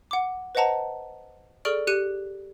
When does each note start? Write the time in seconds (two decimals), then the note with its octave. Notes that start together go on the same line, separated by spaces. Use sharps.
0.11 F#5 D6
0.55 B4 C5 D#5 F#5 A5 A#5
1.65 G#4 A4 D5 C#6 F6 D7
1.87 G4 F#6 C#7 D#7